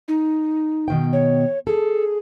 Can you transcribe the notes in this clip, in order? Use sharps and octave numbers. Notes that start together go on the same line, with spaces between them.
D#4
B2 D#3 G5
C#5
G#4 A4